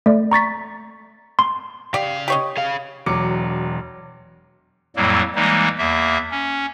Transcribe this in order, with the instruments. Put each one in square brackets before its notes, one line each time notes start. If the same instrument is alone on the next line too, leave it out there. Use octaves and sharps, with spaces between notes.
[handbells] A3 D5
A#5 C#6 A6 B6
C6
[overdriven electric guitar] C#3 F5 [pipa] G4 D5
[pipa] G4 C#5 D#5
[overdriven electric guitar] G#4 F5
[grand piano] E1 F#3 D6 C#7
[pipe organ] F2 A2 F#3 G3 A#3
E3 G3 G#3 A#3 D#4
E2 A#3 E5
C#4